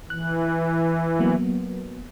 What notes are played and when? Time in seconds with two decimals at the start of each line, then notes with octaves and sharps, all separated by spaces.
0.10 E3 F#6
1.19 F#3 A#3 B3